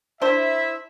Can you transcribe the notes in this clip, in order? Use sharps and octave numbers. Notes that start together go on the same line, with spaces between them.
D4 E4 C5 E5